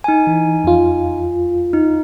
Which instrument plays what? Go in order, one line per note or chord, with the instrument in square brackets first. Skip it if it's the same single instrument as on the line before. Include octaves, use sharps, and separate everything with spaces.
[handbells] D#4 G#5
[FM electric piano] E3
F2 F4
[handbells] D#4